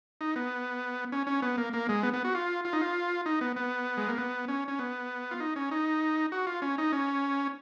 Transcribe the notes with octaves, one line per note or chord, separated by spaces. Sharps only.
D#4
B3
C#4
C#4
B3
A#3
A#3
G#3
B3
B3
F#4
F4
F4
D#4
F4
D#4
B3
B3
G#3
A#3
B3
C#4
C#4
B3
F4
D#4
C#4
D#4
F#4
F4
C#4
D#4
C#4